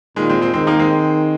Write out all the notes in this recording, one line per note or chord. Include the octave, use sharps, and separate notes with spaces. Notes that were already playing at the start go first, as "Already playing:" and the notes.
A#2 D#3 G#3
G#3 C4
G#3 C4
D#3 G#3 C4
A#3 D#4
G#3 C4